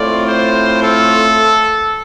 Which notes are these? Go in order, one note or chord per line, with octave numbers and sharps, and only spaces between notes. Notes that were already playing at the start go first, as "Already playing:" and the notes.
Already playing: A2 A3 C4 F4 D5
C5
A4